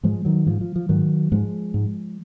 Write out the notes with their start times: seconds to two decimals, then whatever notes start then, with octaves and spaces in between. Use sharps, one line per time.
0.03 G#2 F3 G#3
0.25 D#3 F#3
0.46 G#2 F3
0.61 F3
0.76 F3
0.89 G#2 D#3 F#3
1.32 G#2 F3 G#3
1.74 G#2